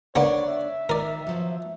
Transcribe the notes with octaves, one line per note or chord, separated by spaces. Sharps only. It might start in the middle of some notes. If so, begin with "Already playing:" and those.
D3 A#3 B3 D4 C#5 D5
E5
D#3 A#4 D5
B2 F3 F#3